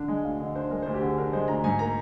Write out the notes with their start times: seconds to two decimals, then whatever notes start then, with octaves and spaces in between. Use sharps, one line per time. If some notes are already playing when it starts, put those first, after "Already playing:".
Already playing: D3 D4
0.08 G#3
0.24 D2 F5
0.40 D3 D#5
0.55 D4 C5
0.70 G#3 A#4
0.82 D2 C5
0.94 G4
1.02 D3 G#4
1.18 D4 A#4
1.33 G#3 C5
1.48 D2 A#5
1.64 G#2 G#5
1.79 A#3 A#5